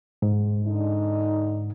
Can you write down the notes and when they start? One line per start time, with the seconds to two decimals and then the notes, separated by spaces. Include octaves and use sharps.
0.22 G#2
0.64 D3 D4 D#4